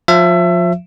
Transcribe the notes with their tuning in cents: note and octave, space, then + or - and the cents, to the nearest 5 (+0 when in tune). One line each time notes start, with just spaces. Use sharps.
F3 +25 E5 +25